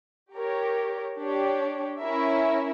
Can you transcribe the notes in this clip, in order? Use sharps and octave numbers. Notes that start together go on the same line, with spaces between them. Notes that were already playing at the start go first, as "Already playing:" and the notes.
G4 A#4 C#5
D4 G4 C#5
C#4 E4 A#4 E5